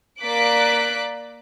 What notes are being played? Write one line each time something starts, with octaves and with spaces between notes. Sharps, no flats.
A#3 D5 D6 F#6 B6 D7